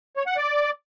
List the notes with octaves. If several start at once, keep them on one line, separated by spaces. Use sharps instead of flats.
C#5
F#5
D5